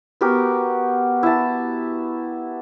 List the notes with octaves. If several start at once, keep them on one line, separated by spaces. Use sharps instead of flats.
B3 F#4 G4 A#4
E4 A5